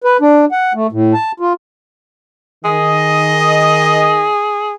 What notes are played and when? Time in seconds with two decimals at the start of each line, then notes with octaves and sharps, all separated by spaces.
0.04 B4
0.21 D4
0.52 F#5
0.74 A3
0.92 A2
1.14 A5
1.40 F4
2.65 D#3 G#4 D#5